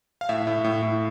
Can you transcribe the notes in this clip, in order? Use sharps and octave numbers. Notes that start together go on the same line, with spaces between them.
F5
A2 E5
A2
A2
A2